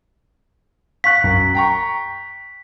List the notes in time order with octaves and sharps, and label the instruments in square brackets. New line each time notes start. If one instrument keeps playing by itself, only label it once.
[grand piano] F5 C#6 F#6 [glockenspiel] B6
[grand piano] F#2
G5 A#5 C#6